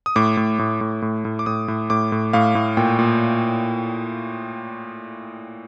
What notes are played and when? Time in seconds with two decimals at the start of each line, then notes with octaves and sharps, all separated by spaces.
0.06 D#6
0.16 A2 D6
0.37 A2
0.59 A2
0.81 A2
1.02 A2
1.25 A2
1.39 D6
1.46 A2 D#6
1.68 A2
1.90 A2 D6
2.12 A2
2.33 A2 F5
2.55 A2
2.77 A#2 G5
2.99 A#2